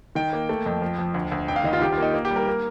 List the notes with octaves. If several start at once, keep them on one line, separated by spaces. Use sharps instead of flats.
D#3 G5
A#3
A3
F2
F3
F3
D2
D2
F1 G5
F5
D#3 D#5
F4
D#3 G4
F4
A#3 D#4
A#3
G4
G3
A#4
A#3